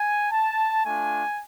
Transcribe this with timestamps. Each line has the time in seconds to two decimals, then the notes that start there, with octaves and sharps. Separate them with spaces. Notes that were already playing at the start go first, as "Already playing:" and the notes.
Already playing: G#5
0.31 A5
0.85 A3 D4 F4 G#5